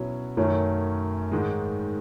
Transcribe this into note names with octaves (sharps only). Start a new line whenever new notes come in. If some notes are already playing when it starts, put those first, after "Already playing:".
Already playing: B2 F#3 C#4 E4
F#2 D#3 F#3 A3 C#4
G#2 D#3 G#3